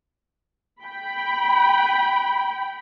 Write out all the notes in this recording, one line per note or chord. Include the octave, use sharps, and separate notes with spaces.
G5 B5